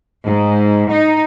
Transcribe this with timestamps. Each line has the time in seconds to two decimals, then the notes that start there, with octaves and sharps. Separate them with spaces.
0.26 G#2
0.92 D#4